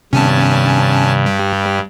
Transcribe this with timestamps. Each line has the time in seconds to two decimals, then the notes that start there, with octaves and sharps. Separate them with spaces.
0.13 G2 C3 D#3 B3 C#4 G#5 A5
1.26 G3